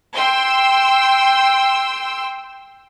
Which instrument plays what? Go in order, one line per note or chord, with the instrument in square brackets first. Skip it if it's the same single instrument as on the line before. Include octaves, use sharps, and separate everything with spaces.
[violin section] G5 C6 E6